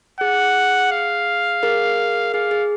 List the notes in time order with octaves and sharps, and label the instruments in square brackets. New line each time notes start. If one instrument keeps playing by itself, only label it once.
[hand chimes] G#4 [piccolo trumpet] F#5
[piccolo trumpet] F5
[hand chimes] G#4 A#4
[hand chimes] G#4 [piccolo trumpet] F5
[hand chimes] G#4